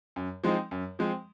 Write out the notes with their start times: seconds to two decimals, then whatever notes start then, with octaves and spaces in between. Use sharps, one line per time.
0.16 F#2
0.44 F3 G#3 C4 D#4
0.71 F#2
0.99 F3 G#3 C4